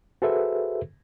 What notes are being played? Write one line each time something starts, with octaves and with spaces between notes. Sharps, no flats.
F#4 G#4 A4 B4 C5 E5